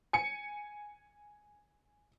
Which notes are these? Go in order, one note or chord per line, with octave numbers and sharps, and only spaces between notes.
G#5 C#7